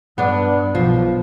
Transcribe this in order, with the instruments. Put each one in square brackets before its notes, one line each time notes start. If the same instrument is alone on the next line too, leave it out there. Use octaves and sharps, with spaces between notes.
[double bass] G2 [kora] B3 D4
[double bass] B1 [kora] F3